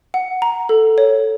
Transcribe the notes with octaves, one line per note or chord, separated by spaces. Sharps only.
F#5
A#5
A4
C#5